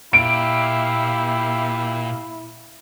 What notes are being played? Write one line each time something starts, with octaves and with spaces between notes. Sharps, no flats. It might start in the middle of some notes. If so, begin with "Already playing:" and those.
A#2 E4 G4 E5 F5 D7